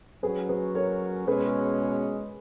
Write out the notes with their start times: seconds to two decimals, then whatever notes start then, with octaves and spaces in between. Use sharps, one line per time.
0.23 F#3 C#4 F#4 G#4 B4
0.49 G#4 B4
0.75 A#4 C#5
1.27 B2 G#3 C#4 G#4 B4